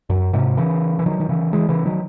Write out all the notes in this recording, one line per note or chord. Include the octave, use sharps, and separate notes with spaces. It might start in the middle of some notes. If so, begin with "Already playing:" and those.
F#2
G#2 C3
C#3 E3
E3
D#3 F#3
D#3
C#3 E3
E3 G#3
C#3 E3
D#3 F#3